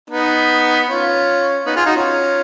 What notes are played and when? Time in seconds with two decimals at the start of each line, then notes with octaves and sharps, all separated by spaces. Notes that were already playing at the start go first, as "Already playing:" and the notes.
0.10 B3 D#4
0.88 C#4 F4
1.66 B3 D#4
1.76 F4 G#4
1.86 D#4 F#4
1.96 C#4 F4